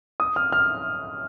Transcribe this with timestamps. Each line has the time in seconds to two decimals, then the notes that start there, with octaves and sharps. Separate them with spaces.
0.20 D#6
0.36 F6
0.52 F6